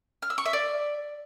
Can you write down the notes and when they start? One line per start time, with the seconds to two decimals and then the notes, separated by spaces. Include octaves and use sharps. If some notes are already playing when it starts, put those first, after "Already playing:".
0.22 F6
0.30 E6
0.38 C#6
0.46 E5
0.53 D5